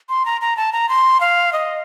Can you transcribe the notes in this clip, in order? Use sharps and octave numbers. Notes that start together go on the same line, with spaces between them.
C6
A#5
A#5
A5
A#5
C6
F5
D#5